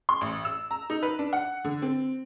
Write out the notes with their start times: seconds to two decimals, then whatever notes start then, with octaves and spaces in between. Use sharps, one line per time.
0.09 C6
0.21 A1
0.45 E6
0.71 A#5
0.90 D#4
1.03 B4
1.19 D4
1.33 F#5
1.64 D3
1.82 C4